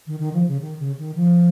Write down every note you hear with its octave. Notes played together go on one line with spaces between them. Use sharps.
D#3
D#3
F3
C#3
D#3
C#3
D#3
F3